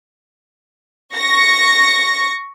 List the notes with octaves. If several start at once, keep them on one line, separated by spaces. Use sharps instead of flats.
C#6 A#6 C#7